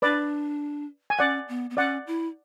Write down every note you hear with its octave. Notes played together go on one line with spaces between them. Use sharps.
D4 B4 D5
G#5
C#4 D5 F#5
B3
B3
C#4 D5 F#5
E4